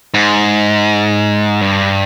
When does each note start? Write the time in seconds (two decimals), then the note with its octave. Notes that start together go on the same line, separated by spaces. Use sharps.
0.14 G#2
1.61 G2